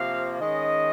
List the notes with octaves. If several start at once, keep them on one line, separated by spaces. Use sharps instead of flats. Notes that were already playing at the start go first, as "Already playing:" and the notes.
Already playing: C3 F3 A#3 F5
D#3 G#3 C#4 D#5